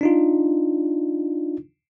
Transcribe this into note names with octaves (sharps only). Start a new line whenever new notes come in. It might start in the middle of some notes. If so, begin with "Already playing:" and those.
D4 D#4 F4